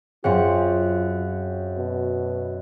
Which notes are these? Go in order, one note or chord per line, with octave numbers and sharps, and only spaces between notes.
F#2 C4 F4 G#4 C#5 F5 F#5
B2